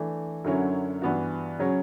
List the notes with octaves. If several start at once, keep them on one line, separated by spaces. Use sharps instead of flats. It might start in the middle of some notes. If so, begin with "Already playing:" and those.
Already playing: E3 A3 D4
F#2 D3 F#3 C#4 E4
G2 E3 B3 F#4
C#3 F#3 C#4